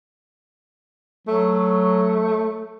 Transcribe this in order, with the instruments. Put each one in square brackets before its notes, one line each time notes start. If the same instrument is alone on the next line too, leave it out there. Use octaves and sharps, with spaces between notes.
[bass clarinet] F#3 [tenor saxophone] A3